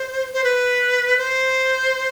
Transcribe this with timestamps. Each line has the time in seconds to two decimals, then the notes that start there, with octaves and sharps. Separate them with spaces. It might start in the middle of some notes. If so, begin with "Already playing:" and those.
Already playing: C5
0.33 C5
0.44 B4
1.17 C5